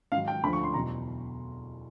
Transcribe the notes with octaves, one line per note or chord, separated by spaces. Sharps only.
G#2 D#3 F#3 F5
G5
D2 D3 F3 B5
C#6
C6
E2 B2 F#3 A#5